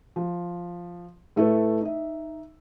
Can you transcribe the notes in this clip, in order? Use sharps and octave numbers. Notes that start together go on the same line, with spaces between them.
F3
A2 A3 E4 A4 B4
D#4 E5